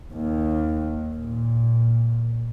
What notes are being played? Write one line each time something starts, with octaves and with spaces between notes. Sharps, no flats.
D#2
A#2